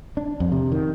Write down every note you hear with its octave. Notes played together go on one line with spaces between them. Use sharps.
D4
F2
C3
D#3